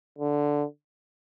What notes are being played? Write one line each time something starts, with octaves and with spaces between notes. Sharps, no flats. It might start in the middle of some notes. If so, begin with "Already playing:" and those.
D3